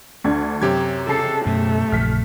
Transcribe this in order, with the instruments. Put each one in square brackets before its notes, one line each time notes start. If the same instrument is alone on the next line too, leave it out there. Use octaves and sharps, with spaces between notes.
[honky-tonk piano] D2 D4 G#6
[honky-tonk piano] F#2 [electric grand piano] C3 G4 G#6
[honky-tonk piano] C#3 A5 C7 [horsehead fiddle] A4
[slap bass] F#2 B2 [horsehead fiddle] A3
[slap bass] A#1 F#2 C#3 [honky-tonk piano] F6 B6